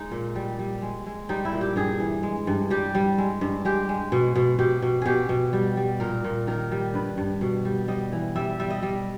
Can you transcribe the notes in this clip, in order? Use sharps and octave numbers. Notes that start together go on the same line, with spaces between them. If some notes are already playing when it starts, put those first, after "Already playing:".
Already playing: G#3 D#4
A#2
G3
G3
G#3
G#3
G3 D#4
E4
A#2
G4
G2 G#4
E3
G#3
G2
G3 G4
G3
G#3
G2
G#3 G4
G#3
B2
B2
B2 G4
B2
B2 G4 G#4
B2
G3
G3
A#2 A#4
A#2
D#3 A#4
G3
G2 B4
G2
B2
G3
G3 D#5
E3
G3 E5
G3 E5
D#5
G3